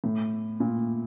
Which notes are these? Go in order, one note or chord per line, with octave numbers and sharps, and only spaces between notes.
A2
A#2